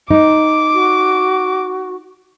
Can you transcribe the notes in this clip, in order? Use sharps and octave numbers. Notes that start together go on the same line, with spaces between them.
D#4 D6
F#4